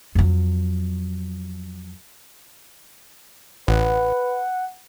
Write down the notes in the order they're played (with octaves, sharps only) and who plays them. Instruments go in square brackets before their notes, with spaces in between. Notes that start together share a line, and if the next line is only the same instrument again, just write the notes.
[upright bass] F2 F#3
[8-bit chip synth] A1 [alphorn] B4 [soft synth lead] F#5